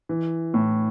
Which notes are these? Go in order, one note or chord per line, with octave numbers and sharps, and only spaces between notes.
E3
A2